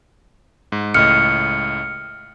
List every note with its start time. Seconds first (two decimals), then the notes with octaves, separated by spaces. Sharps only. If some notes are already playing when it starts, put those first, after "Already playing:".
0.72 G#2
0.94 C#2 A2 D#5 F6 C#7